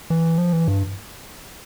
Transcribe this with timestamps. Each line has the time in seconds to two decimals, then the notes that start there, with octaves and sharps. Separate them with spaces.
0.10 E3
0.38 F3
0.53 E3
0.68 G2